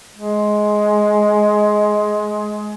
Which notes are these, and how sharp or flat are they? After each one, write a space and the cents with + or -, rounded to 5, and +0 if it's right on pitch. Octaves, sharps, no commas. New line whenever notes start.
G#3 +15